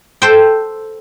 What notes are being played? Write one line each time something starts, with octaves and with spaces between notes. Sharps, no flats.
A4 C5 G5